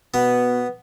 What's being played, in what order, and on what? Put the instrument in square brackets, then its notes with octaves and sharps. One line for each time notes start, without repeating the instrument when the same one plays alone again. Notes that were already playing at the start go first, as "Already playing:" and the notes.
[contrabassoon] B2 [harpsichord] B3